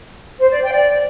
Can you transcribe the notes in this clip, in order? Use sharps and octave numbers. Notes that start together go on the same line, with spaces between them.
C5
D5
G5
D5